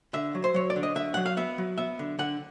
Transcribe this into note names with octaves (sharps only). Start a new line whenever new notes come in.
D3 E5
F#3
C5
F#3 C#5
D5
D3
D#5
D3 E5
F#3 F#5
F5
B3 E5
F#3
B3 E5
D3
D3 F#5